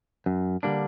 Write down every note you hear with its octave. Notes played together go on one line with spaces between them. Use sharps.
F#2
D3 G3 A#3 D4